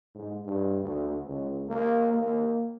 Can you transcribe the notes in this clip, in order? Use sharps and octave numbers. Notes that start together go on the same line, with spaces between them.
G#2
G2
D2
C#2
A#3
A#3